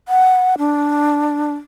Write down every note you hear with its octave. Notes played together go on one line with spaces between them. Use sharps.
F#5
D4